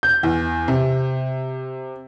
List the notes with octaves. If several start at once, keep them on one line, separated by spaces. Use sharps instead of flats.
G6
E2
C3